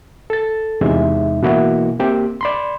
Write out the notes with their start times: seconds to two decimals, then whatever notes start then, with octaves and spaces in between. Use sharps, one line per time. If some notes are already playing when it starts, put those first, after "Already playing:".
0.30 A4 A6
0.81 E2 C3 G#3 D#4 E5
1.43 B2 E3 A#3 E4 F#4
2.00 A#3 C4 G4
2.41 D5 B5 C6